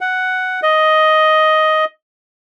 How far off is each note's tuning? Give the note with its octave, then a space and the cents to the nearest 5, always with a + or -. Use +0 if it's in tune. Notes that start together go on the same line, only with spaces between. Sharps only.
F#5 +5
D#5 +5